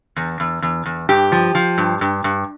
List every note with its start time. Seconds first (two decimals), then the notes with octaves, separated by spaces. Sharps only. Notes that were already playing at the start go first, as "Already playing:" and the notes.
0.16 E2
0.40 E2
0.62 E2
0.86 E2
1.09 G2 G4
1.32 F3
1.55 F3
1.78 G2
2.01 G2
2.24 G2